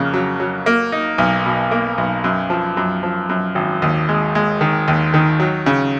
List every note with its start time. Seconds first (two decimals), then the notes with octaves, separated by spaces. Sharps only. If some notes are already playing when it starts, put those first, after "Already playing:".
Already playing: F2 C#3 A#3
0.13 F#3
0.40 F#3
0.66 A#3
0.92 D#4
1.18 B1
1.46 B2
1.71 A#3
1.98 B1
2.24 F#2
2.50 F3
2.77 F#2
3.03 F3
3.29 F#2
3.55 G#1
3.82 D#2
4.09 G#3
4.35 G#3
4.61 D#3
4.88 D#2
5.14 D#3
5.40 F#3
5.66 C#3